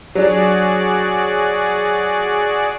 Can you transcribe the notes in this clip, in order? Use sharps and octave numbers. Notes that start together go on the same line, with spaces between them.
F#3 D4 F#4 G#4 D5